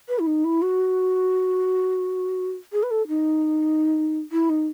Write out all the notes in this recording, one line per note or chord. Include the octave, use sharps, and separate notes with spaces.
B4
E4
D#4
E4
F#4
G#4
B4
A4
D#4
E4
D#4